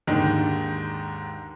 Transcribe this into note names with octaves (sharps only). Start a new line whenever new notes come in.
D#2 G#2 D3 D#3